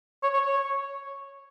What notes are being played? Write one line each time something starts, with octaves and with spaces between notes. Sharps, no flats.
C#5
C#5
C#5